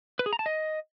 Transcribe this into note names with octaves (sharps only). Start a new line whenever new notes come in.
B4
G#4
A#5
A5
D#5